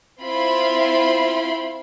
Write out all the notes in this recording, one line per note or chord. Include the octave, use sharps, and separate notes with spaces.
C4 E4 F4 B5 C6